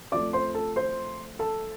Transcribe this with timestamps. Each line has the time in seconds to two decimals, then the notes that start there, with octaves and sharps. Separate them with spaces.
0.12 F2 F3 A3 D5 D6
0.33 C5 C6
0.55 A4 A5
0.76 C5 C6
1.39 A4 A5